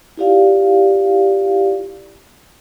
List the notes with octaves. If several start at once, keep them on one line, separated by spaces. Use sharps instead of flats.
E4 F4 G4 D5 F5